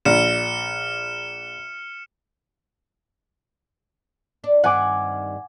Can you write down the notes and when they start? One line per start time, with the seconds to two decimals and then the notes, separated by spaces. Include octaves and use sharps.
0.05 A#1 D4 F6 C#7 E7
4.44 D4
4.64 G2 D#3 C4 F#5 G#5 D6